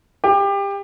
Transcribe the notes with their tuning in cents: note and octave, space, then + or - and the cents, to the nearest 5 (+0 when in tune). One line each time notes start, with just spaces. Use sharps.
G4 +25